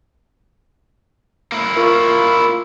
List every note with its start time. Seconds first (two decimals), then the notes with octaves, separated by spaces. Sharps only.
1.52 A#3 E4
1.76 F4 A#4 C#6